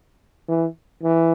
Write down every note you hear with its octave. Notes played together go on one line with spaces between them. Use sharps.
E3
E3